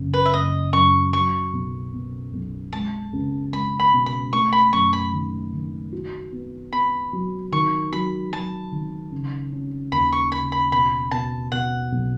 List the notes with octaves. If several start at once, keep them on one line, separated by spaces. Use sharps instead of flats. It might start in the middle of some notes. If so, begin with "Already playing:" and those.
Already playing: F#1 C#3
B4
E5
F#1 D#5
F#2 C#6
F#3 C#6
B1
B2
B1
G#3 A5
C#2
G#3 B5
B5
B2
B5
A3 C#6
B5
F#2 C#6
B5
D#3
D#3
F#4
B3
B3 B5
F#3
D#3 C#6
F#3 B5
F#3 A5
D#3
C#3
C#4
D#2 B5
C#6
C#3 B5
B5
B2 B5
B2 A5
B2 F#5
B1